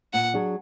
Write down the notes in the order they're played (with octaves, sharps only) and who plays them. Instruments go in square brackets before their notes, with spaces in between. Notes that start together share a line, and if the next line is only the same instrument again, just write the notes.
[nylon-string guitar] A#2 [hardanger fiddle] F#5
[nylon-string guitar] F#3 D4 G#4